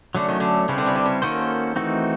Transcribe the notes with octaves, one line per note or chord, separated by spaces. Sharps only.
D3 F#3 A3 C#4
D#3
D3
C#3 G3 C4 E4 G4 B4
D3
C#3
D3
C#3
D#3 A#3 C#4 F#4 A4 C5
E3 A3 C4 D#4 F#4